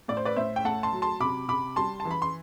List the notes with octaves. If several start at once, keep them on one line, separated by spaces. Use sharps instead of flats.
A2 D5
C5
B4 D5
A2 C5 E5
G5
A3 F#5 A5
A5 C6
F#3
A5 C6
C3 B5 D6
C3 B5 D6
G3 A5 C6
A5
E3
B5
C6